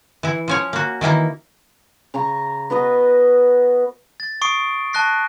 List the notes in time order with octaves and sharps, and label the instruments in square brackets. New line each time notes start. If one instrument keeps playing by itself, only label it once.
[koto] E3 E4
F3 C#4 C#5
A#3 F#4
D#3 E3 A#3 E4
[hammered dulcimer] C#3 A#5 C#6
B3 F#4 B4 D#5
[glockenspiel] A6
C#6 D#6 C7 D7
A5 C#6 F#6 A#6 C7